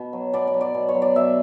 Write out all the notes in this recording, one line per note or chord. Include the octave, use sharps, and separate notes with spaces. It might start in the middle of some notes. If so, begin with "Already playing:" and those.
Already playing: B2
F#3
B2 D5
D5
F#3
D5
B2
C#5
F#3
D5
B2 E5